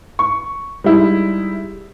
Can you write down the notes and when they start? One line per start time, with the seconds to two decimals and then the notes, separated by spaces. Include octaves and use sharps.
0.19 C#6
0.84 G3 G#3 D#4 E4